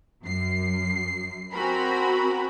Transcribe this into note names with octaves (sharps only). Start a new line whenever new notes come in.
F#2 C7
C4 F#4 A#4 G#5 A#5 B5